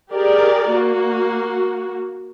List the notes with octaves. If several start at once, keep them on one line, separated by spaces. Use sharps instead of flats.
G4 G#4 A#4 D5
A#3 F#4